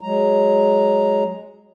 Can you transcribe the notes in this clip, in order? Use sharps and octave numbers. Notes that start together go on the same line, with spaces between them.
F#3 G#3 A#5